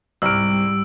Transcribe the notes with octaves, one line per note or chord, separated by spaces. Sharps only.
C2 G#2 G3 E6 F6 D7